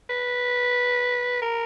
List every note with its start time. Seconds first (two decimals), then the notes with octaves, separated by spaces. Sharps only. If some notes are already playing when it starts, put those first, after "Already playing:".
0.10 B4
1.42 A#4